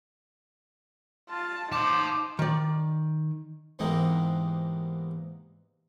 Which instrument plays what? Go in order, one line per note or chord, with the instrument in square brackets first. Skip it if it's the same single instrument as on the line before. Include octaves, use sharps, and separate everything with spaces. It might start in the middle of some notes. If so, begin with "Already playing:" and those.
[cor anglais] F4 [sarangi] A5
[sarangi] D#4 [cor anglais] C5 [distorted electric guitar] A5 C6 [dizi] D6
[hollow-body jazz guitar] D#3 D5
[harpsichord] E2 G#2 C3 G#3 A#3 B3